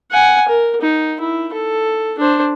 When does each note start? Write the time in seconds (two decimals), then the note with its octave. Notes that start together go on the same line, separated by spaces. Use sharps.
0.11 F#5 G#5
0.48 A#4
0.81 D#4
1.20 E4
1.53 A4
2.19 D4 C5